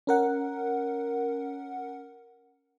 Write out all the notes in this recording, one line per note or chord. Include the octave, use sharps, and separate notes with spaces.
C#4 A#4 F#5